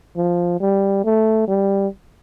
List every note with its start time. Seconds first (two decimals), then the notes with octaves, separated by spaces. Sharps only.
0.17 F3
0.61 G3
1.05 A3
1.48 G3